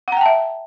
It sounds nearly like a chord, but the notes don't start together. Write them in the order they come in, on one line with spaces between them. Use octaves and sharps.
F#5 A#5 G5 A5 E5